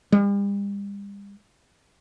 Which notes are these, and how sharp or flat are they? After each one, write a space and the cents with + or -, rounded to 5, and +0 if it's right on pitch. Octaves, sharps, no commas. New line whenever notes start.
G3 +40